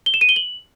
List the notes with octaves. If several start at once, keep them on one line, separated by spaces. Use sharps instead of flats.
G7
E7
D#7
G7
F#7